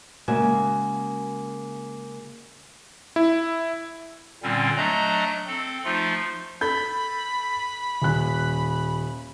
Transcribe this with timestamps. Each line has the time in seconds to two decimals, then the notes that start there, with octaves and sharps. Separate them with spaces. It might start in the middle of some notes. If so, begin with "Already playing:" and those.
0.28 C#3 G#3 A#3 F#4 E5 G#5
3.16 E4
4.43 A#2 D3 G3 C4 C#4
4.77 F#3 A3 D4 D#5 A#5
5.47 C4 A4
5.85 F3 A3 D#4 F4
6.61 A4 B5 G6
8.02 D#1 F#6